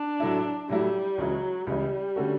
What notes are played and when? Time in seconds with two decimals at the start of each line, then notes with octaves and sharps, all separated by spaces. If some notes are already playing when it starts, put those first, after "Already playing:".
Already playing: D4
0.20 A2 F#3 A3 E4
0.69 A2 F#3 G3 A3 E4
1.18 C#2 C#3 E3 F#3
1.67 C#2 C#3 E3 G3
2.16 D3 A3 C#4 F#4 A4